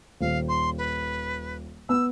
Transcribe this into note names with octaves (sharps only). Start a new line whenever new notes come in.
D#1 F5
C6
B4
B3 E6